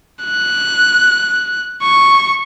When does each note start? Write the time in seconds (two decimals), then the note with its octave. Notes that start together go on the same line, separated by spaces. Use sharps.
0.24 F#6
1.83 C#6